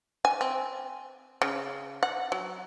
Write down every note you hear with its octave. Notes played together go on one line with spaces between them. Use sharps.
G#5
C4
C#3
F#5
F#3